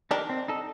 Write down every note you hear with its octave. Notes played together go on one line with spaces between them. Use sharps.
D4 D#4 G4 A#4
C4
D#4 A4